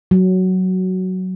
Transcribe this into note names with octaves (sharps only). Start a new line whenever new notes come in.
F#3